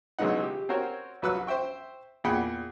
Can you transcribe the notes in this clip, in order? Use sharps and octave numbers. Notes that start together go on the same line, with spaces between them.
B1 C#3 E3 G#3 D#4 F#5
G4
C4 C#4 F#4 A#4 C5 C#5
C2 F#3 B4 F#5 E6 F#6
C5 E5 G5 C#6
E2 A#2 G#4 F#5 G5 B5